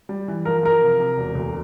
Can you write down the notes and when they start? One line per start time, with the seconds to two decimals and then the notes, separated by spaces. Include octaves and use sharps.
0.09 G3
0.28 E3
0.45 F3 A#4
0.63 F3 A#4
0.81 C3
1.00 C3
1.17 E1
1.35 D2